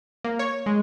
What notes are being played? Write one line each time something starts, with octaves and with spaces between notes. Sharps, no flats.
A#3
C#5
G#3